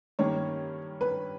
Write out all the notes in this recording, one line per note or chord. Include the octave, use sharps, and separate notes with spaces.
G2 D#3 A#3 C#4 C#5
B4